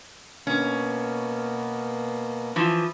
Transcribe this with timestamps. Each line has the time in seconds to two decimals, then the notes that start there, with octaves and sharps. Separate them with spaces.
0.47 B2 A#3 B3 C#4
2.56 E3 F3